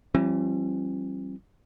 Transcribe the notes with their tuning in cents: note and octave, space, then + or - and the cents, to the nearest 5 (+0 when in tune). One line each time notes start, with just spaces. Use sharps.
E3 +40 G3 -20 C4 +45